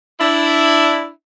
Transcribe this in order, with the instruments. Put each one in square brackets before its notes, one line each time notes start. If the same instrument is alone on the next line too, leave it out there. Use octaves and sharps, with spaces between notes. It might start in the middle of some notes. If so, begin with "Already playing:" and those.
[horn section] D4 E4